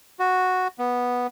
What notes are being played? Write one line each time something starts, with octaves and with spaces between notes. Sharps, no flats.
F#4
B3